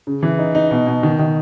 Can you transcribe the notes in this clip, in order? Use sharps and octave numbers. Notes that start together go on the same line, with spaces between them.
C#3
E3
D#4
D#4
B2
B2
D#3
D#3